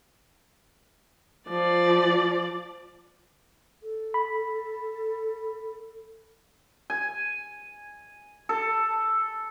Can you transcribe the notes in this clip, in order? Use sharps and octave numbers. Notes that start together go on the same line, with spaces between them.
F3 D5
A4
B5
G#5
A4